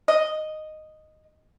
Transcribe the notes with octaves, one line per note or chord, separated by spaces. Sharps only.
D#5